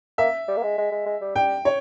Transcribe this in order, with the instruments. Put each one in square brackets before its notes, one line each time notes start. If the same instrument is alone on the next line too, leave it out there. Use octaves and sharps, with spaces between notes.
[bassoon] A#3 [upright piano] E5
[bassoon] G3
A#3
G#3
G#3
G#3
G#3
G3
[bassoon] G3 [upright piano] G5
[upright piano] C#5